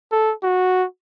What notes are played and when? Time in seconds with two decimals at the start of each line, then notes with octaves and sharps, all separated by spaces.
0.12 A4
0.43 F#4